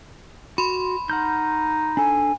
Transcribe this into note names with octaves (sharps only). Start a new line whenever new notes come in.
F#4 B5 C6
D#4 F#5 F6 G6
D4 A4 G#5